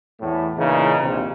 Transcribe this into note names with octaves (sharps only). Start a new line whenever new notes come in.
E2 A2
A#2 C#3 E3 D#4
A#1 D#2 C3